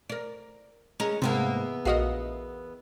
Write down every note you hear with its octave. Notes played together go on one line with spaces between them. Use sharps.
A#4 D5
G#3 C#4 A#4
E2 G#2 C3 A#3 B3 E5
A#1 F#4 A#4 B4 D#5 F5